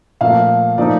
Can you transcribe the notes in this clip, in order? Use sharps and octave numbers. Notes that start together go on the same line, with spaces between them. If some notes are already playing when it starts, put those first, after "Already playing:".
A#2 F3 A3 F5
A#2 F3 A3 D#4 D5